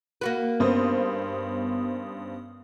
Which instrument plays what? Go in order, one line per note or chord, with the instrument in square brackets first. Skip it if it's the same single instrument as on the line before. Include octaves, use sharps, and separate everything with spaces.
[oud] A#3 F#4 B4
[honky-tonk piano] G2 C#4 C5 [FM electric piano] B3 D#6